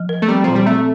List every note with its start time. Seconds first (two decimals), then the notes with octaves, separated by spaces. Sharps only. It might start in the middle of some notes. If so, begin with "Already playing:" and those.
Already playing: F3
0.09 A#4
0.22 A3
0.28 G3 C4
0.44 A#2 F3
0.55 G3
0.66 A3 C4